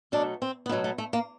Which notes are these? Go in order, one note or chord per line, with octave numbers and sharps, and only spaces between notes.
B2 F#3 A3 D4
C4
B3
B2 F#3 A3 A#3
A3
A3
A#3